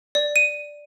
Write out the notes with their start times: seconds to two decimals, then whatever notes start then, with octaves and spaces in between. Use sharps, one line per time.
0.15 D5
0.36 D#7